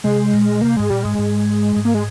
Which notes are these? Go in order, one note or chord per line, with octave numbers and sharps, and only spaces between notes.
C3 G#3
A#2
C3 A#3
G#2 G#3
A#2 G3
G#2 G#3
G#2
G#2
A#3
G#3